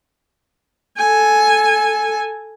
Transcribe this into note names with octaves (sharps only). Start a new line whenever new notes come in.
A4 G#5